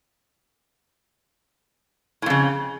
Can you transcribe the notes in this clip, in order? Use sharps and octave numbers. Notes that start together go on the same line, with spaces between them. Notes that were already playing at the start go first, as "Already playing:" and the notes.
F2 A2 C#3